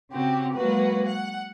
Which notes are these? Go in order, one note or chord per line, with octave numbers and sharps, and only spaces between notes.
C#3 C4 F#4 G4
F#3 G#3 A#3 F#4 B4
F#5